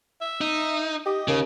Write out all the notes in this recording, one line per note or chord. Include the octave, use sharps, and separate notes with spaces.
E5
D#4
G4 D#5
D#2 C#3